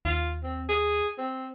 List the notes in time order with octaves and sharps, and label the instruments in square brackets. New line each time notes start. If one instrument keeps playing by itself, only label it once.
[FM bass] D#2 [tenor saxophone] F4
[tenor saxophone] C4
G#4
C4